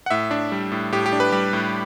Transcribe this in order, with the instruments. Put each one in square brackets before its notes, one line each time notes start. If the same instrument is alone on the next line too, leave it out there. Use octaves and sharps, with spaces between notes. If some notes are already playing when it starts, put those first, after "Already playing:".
[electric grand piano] F#5
A2 E5
D4
G3
A2
A2 G4
G4
D4
B4
G3 G4
A2